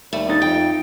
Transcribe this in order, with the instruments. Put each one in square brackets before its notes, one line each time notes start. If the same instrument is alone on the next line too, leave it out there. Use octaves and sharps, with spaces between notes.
[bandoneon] D#2 G3 [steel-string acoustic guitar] A3
[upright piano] D#4 A6
[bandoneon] F2 [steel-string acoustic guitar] G5